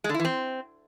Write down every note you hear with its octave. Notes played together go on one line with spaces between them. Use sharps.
G#3
D3
E4
E3
C4